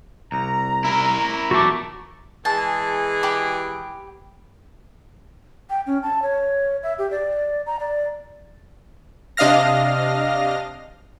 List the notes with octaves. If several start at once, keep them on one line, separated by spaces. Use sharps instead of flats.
C2 A#5
E4 A#4
B1 E2 A3 F#4 D6
E3 G#3 G#4 A5
G4 B5
G5
C#4
A5
C#5
E5
G4
D5
A#5
D5
C3 D4 D#5 F5 F6 A#6